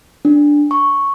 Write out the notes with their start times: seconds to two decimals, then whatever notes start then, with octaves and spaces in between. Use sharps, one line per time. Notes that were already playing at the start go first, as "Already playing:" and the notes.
0.25 D4
0.71 C#6